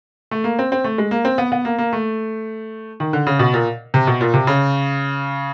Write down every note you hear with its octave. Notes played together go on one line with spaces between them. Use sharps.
A3
A#3
C4
C4
A3
G#3
A#3
C4
B3
B3
A#3
A#3
A3
D#3
D3
C#3
B2
A#2
C3
B2
A#2
C3
C#3